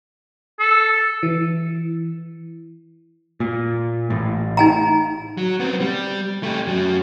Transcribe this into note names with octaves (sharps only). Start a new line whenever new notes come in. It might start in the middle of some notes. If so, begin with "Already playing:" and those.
A4
E3
A#2
A1 A2
D#4 G#5 A#5
F#3
B3 C4
G3
A3 G4
F#2 F#3